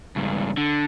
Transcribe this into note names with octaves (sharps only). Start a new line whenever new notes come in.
C#2 G2
D3